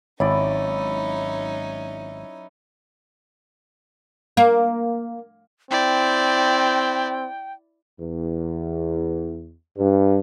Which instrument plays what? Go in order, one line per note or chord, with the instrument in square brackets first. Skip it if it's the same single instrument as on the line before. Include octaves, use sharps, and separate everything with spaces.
[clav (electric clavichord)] G#1 [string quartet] F#3 C#4 D#4 [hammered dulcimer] E4 D5 [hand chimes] C#5
[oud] A#3
[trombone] C4 [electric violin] E4 D5 [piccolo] G5
[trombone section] E2
G2